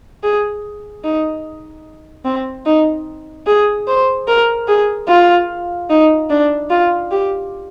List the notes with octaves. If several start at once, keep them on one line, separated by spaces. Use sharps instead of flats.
G#4
D#4
C4
D#4
G#4
C5
A#4
G#4
F4
D#4
D4
F4
G4